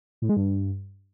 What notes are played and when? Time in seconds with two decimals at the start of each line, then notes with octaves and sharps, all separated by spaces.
0.22 A2
0.29 G#3
0.37 G2